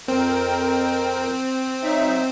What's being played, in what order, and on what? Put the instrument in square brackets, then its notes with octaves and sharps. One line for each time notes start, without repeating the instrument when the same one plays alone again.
[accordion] F2 A#4 G5 [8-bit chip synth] C4
[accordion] F#3 D#4 E5